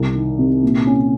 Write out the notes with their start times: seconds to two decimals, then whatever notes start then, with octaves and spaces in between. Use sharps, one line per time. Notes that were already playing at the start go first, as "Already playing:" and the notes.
Already playing: C2
0.15 D#3
0.39 C3
0.63 A#2
0.87 C#4